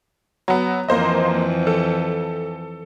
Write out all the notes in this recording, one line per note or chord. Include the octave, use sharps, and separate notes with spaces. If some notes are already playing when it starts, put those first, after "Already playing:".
F#3 B3
F2 E3 A#3 C5 D#5
A4